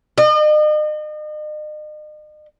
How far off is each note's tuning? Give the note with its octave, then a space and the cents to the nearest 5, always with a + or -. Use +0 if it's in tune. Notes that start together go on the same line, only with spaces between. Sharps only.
D#5 -40